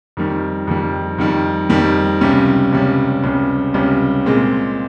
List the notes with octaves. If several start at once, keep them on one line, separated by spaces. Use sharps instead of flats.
F2 D#3 G3
F2 D#3 G3
F2 D#3 G3
F2 D#3 G3
C#2 C3 G3 C#4
C#2 C3 G3 C#4
C#2 C3 G3 C#4
C#2 C3 G3 C#4
A#2 G#3 C4